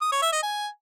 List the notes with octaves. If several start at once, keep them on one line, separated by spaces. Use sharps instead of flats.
D#6
C#5
E5
D#5
G#5